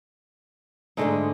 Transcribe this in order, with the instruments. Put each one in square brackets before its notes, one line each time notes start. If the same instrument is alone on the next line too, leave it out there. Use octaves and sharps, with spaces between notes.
[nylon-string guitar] G#2 D3 D4 [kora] G#3 A3 D#4